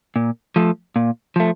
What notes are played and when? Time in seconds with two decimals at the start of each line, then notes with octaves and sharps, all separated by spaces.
0.16 A#2
0.56 F3 A3
0.96 A#2
1.36 F3 A3